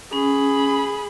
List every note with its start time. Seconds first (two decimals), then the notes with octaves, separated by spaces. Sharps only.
0.13 C#4 G#4 B5